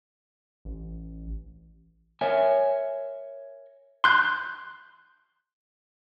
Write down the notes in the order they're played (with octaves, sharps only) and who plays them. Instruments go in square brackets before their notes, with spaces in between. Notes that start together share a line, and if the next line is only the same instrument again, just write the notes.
[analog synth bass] A1
[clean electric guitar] A#4 C#5 E5 G#5
[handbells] C6 F#6 G6